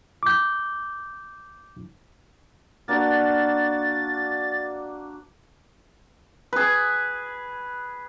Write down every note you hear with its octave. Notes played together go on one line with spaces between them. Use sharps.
D6 G6
A#3 D4 F#4 A6
G#4 B4